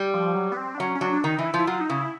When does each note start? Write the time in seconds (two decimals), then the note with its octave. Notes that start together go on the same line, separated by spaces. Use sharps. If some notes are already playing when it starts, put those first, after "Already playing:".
Already playing: G3
0.14 F3
0.36 F#3
0.52 B3
0.57 C4
0.75 D4
0.79 F#3 C#4
0.95 C#4
1.01 F#3 D4
1.13 D4
1.24 D#3 D#4
1.39 E3
1.46 E4
1.54 F3
1.59 E4
1.67 F#3 F4
1.81 D#4
1.89 C#3 E4